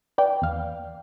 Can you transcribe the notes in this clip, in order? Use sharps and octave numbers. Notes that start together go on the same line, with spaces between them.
B4 D5 G5
E2 F5